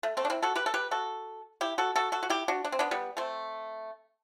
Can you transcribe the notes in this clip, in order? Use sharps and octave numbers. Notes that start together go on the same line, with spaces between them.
A3
A3 C4
D4
C4 E4
F#4 A4
G4 B4
A4
G4 B4
F#4 A4
E4 G4
F#4 A4
F#4 A4
F#4 A4
F#4
E4 G4
D4 F#4
D4
C4
B3 D4
G3 B3
A3 C4